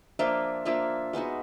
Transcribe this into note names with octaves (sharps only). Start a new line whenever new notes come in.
F3 A#3 D4 F4 E5
F3 A#3 D4 F4 E5
G#3 B3 D#4 F#4